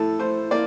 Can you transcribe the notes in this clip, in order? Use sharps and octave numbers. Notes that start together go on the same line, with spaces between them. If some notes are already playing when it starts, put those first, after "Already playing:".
Already playing: A2 A4
A2 C5
A#3 D5